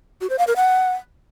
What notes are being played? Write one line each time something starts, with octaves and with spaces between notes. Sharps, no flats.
F#4
C5
F5
A#4
F#5